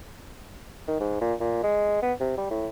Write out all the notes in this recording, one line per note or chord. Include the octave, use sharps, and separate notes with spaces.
D#3
G#2
A#2
A#2
G#3
B3
C3
G3
A2